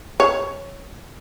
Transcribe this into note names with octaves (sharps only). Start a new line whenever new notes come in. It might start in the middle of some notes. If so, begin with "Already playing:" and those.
C#5